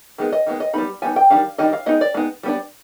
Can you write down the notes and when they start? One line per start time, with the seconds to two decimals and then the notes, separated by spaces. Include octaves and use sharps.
0.18 D#3 G#3 B3
0.32 D#5
0.46 D#3 G#3 B3
0.60 D#5
0.73 G3 B3 D#4 B5
1.02 G3 B3 D#4 G#5
1.16 G5
1.30 D#3 G3 D4 F5
1.58 D#3 G3 D4 D#5
1.73 F5
1.86 G#3 B3 D#4 D#5
2.01 D5
2.14 G#3 B3 D#4
2.43 G3 B3 D4